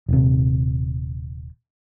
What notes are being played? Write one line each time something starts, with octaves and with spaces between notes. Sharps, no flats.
D#1 C3